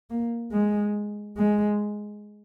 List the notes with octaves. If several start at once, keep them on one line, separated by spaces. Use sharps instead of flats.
A#3
G#3
G#3